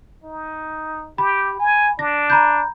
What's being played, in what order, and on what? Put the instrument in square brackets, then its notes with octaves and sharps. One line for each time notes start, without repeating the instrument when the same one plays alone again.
[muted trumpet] D#4
[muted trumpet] G4 [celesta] B5
[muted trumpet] G#5
[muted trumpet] D4 [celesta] A#6
[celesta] A#5 B5 G6